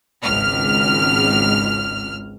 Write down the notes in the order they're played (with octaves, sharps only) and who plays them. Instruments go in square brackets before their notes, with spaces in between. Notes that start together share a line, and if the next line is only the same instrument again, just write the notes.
[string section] G#1 C#2 F6